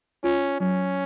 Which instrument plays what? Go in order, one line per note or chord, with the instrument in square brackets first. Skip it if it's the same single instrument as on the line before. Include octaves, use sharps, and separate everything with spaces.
[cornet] C#4 [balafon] F4
[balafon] F#3 [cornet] C#4